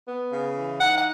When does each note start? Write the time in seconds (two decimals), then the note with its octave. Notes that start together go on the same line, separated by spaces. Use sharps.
0.07 B3
0.31 C#3
0.55 E3
0.80 D#4 F#5
0.98 F#5